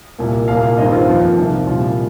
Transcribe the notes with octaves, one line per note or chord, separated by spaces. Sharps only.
C2 A#2 A#3
C2 A#2 A#3 F5
F5
G2 D#3 C4 D#5
F4
F2 F3 A#3 F4
C2 C3 D#3
C2 A#2 G3 F4